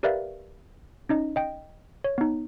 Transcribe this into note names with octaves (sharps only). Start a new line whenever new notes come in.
G4 A#4 B4 D5 E5 F5
C#4 D#4 D#5
D#5 G5
C#5
B3 D#4